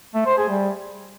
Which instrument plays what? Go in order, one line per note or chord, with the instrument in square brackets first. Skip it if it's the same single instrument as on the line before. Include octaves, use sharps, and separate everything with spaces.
[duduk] A3
C5
G#4
G3